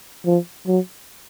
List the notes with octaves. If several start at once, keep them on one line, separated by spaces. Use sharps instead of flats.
F3
F#3